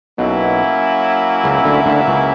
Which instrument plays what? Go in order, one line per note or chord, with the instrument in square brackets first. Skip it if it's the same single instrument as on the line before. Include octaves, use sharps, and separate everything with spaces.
[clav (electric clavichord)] B1 B2 [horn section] F#3 A#3 C#4 E4
[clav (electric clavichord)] C#2 C#3
D2 D3
D2 D3
C#2 C#3